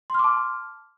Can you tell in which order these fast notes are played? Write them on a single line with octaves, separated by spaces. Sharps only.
C6 F6 D6 A5